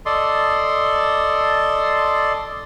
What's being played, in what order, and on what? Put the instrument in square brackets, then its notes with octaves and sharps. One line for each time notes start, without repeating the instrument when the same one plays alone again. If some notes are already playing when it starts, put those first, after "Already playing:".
[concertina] A4 D5 D#5 C6